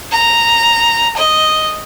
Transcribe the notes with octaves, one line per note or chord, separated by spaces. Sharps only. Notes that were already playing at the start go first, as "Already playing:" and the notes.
A#5
D#5